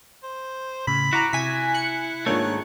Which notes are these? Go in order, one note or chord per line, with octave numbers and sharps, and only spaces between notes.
C5
A2 C#3 B5
E4 F#4 A#5 D6
C3 E4 G#5 B6
F#6 C#7
G#2 D#3 A3 A#3 D4 F4 C#5